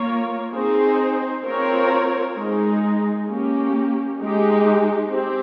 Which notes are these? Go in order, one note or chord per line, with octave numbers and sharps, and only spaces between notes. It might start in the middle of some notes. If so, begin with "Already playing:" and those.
Already playing: A#3 F4 A#4 C#5
C4 D#4 G#4 C5
C4 F4 A#4 C#5
G#3 D#4 G#4
A#3 C#4 G4
G#3 D#4 G4
C4 G4